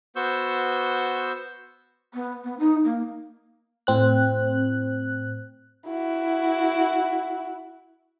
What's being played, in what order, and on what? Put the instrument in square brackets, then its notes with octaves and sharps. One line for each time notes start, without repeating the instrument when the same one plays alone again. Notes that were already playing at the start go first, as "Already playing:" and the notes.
[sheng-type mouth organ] B3 F#4 C5 C#6 E6 G6
[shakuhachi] B3
B3
D#4
A#3
[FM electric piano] A2 C4 F#6
[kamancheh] E4 F#4